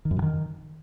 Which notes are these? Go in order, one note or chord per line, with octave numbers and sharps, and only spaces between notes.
D#3
F#2
C3
D#3